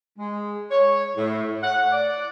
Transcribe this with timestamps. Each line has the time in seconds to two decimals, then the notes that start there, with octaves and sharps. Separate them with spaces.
0.19 G#3
0.71 C#5
1.17 A2
1.63 F#5
1.92 D5